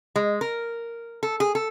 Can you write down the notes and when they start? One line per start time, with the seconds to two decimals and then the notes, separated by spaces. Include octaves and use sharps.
0.16 G#3
0.41 A#4
1.23 A4
1.40 G#4
1.55 A4